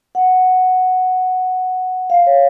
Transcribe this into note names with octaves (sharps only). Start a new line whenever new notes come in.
F#5
F5
C#5